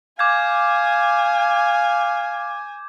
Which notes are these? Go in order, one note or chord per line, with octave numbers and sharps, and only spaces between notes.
F5 G#5 D6 G6 G#6